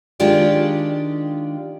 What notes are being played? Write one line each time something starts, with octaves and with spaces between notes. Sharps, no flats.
D#3 G#3 D4 F4 G4